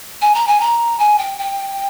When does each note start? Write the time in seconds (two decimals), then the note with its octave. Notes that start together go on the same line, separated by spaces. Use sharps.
0.22 G#5
0.35 A#5
0.47 G#5
0.60 A#5
0.99 G#5
1.18 G5
1.39 G5